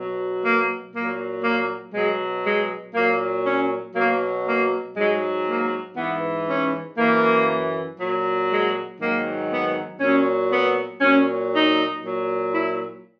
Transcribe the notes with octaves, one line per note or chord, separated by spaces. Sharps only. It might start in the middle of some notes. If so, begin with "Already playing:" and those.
Already playing: B2 F#3
A#3
A#2 F#3 A#3
A#3
B2 F#3 G#3
G#3
A#2 F#3 A#3
C#4
B2 F#3 A#3
A#3
G#2 F#3 G#3
A#3
G#2 E3 B3
C#4
F#2 E3 A#3
A#2 F#3
G#3
G#2 D#3 F#3 A#3
B3
A#2 F#3 C#4
B3
A#2 F#3 C#4
D#4
A#2 F#3
E4